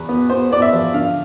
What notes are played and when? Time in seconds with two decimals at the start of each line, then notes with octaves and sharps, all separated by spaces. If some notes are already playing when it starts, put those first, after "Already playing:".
Already playing: E2 B4
0.09 B3
0.30 B3 C5
0.51 B3 D5
0.62 E5
0.73 F3
0.94 D3 F5